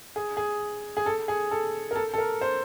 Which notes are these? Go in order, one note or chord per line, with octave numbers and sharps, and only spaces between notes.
G#4
G#4
G#4
A4
G#4
A4
A#4
A4
A4
A#4
C5